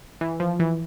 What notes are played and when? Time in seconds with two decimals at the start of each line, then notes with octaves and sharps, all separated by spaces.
0.21 E3
0.40 F3
0.60 E3